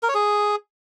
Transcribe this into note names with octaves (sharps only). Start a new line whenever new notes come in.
A#4
C#5
G#4